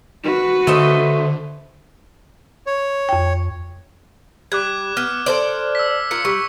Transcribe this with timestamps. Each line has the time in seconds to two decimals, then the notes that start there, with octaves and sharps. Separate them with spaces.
0.24 F#4 B4
0.67 D3 A3 C5 D#5
2.67 C#5
3.09 F2 G5
4.52 G3 D6 F#6 G#6
4.97 B3 F6
5.26 A4 C5 D5
5.75 E6 B6
6.11 F4 A#4 C#7
6.25 G3 C#6 E6